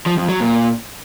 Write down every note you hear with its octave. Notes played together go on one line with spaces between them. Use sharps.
F3
F2
F#3
A#2